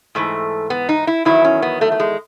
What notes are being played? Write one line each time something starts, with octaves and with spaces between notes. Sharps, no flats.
G#2 E3 A3
B3
D#4
E4
E2 D#3 F#3 E4
C#4
B3
A3
A3
G#3